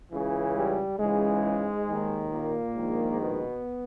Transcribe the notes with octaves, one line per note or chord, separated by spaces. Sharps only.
C#2 C#3 E3
G3
C#2 G#2 C#3 E3 G#3
D#2 D#3
A#2 A#3
A#1 G#2 D#3
B2 B3